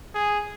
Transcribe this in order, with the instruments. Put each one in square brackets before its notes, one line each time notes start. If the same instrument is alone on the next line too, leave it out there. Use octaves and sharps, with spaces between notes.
[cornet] G#4